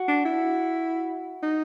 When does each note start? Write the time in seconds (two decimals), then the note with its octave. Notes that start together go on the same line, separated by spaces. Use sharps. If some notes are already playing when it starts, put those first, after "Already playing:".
Already playing: F#4
0.08 D4
0.25 E4
1.43 D#4